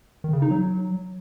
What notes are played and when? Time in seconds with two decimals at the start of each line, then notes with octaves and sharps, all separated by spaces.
0.24 D#3
0.33 C#3
0.42 D#4
0.51 F#3